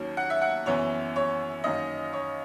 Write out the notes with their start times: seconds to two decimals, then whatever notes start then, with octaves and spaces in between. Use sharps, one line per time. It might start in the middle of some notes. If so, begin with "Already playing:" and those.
Already playing: D#2 D#3 F#3 C#4
0.17 F#5
0.30 E5
0.42 F#5
0.66 F#2 E3 B3 C#5
1.16 C#5
1.64 F#2 D#3 A#3 C#4 D#5
2.13 C#5